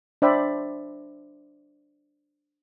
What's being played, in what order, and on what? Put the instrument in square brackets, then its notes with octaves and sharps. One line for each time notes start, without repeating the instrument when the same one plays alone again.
[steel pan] D4 C5 D5 E5 G5 B5